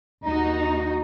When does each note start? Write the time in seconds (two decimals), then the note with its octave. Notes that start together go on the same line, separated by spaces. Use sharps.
0.24 D#2 D#4 F#4 A#5